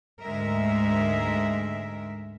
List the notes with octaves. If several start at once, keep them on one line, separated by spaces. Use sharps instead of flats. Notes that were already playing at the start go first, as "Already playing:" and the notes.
D2 G#2 G#3 A#4 E5